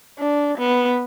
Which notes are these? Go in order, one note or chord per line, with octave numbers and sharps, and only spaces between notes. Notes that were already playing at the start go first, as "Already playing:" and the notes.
D4
B3